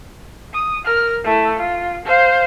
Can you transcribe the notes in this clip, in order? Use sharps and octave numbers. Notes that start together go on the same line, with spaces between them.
D#6
A#4 F6
A3 E4
F4
C5 F5